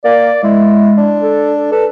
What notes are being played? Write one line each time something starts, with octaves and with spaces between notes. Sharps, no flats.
A#3 D5
G#3 E4
D4
A4
A4 B4